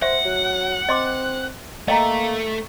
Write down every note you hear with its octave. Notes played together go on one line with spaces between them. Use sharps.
C5 E5 F#5
F#3
C4 D#5 C6 D6
A3 A#3 D#5 G5 A#5